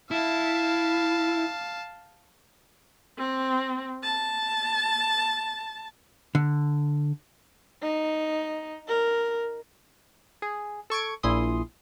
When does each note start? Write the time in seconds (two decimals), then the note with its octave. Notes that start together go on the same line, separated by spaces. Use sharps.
0.11 E4 F5 A5
3.18 C4
4.03 A5
6.35 D3
7.83 D#4
8.89 A#4
10.42 G#4
10.90 A4 C#6 G#6 D7
11.23 A#1 A#2 E4 G#4 C6 D#6